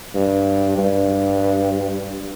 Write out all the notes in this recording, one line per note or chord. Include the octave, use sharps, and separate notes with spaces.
G2
G2